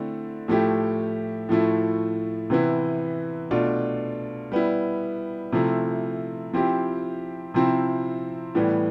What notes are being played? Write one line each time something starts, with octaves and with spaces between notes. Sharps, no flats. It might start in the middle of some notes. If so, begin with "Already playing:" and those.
Already playing: D3 A3 C4 E4
A2 F3 A3 E4 G4
A2 F3 A3 E4
C3 E3 B3 E4
B2 A3 D4 F4
G3 B3 E4
C3 F3 A3 E4
F3 C4 E4 G4
C3 F3 C4 E4
A2 E3 G3 B3